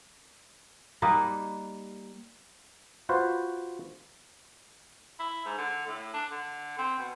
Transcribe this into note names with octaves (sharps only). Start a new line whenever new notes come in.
G3 A#3 D#4 B4
F4 F#4 B4 C5
E4
G#2
D3
A2
D4
D3
C4
B2